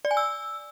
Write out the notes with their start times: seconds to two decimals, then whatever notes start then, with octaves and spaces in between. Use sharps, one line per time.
0.05 D5
0.11 G#5
0.17 E6